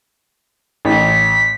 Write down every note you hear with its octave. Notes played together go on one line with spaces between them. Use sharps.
A1 B6